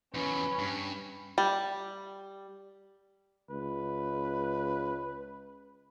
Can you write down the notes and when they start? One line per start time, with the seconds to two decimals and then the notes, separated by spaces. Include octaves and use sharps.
0.15 E2 F#3 C#4 B4
0.59 G2
1.38 G3
3.51 C#2 B4